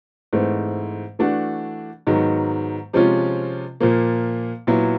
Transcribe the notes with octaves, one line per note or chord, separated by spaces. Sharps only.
G#2 E3 A3 C4
E3 A3 D4 F#4
G#2 D#3 F#3 B3
C3 F3 G#3 C#4 F4
A#2 F3 A#3
A#2 F#3 B3 E4